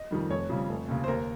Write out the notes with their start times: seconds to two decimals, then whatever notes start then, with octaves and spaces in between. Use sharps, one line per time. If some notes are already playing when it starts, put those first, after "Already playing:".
Already playing: D#5
0.11 F2 D#3 G3
0.30 F1 C#5
0.49 F2 C#3 G3
0.69 F1
0.88 D#2 C#3
1.04 C5
1.08 D#2 A#4